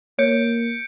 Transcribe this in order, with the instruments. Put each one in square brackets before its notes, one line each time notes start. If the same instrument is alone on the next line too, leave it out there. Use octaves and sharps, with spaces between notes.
[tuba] A#3 [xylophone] C#5 [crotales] G6 C#7 D7